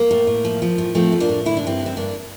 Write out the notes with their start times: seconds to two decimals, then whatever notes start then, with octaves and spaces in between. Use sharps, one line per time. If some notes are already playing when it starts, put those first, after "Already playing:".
Already playing: A#3
0.11 A2
0.27 A2
0.45 F3
0.62 F3
0.78 A2
0.95 F3 A3 C4
1.12 A2
1.20 A#3 D4
1.29 A2
1.46 D3 E4
1.57 D4
1.63 G2 C4 E4
1.80 D3
1.86 C4
1.96 G2 A#3 D4